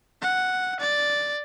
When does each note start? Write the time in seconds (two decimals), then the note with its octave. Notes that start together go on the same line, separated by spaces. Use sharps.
0.22 F#5
0.80 D5